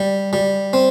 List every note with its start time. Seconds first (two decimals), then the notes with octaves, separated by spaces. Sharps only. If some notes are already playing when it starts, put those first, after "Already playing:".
Already playing: G3
0.33 G3
0.73 C4